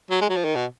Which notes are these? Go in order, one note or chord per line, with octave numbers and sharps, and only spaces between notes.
F#3
G#3
F#3
F3
D#3
B2